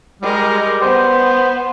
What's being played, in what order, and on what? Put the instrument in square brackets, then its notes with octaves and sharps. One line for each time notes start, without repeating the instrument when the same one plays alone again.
[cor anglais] G3 [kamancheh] G#3 A#4
[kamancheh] B3 [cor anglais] C5